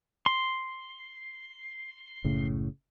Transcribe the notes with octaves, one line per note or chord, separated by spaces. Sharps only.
C6
F#1 A2 C#3